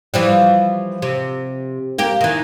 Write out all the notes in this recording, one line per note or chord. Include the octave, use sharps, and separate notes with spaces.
E3 F3 G3
C3
A#3 G4
D#3 E3